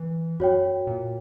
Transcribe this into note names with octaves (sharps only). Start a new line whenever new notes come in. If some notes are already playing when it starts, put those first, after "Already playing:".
Already playing: E3
F#2 F#4 C#5 G5
A#2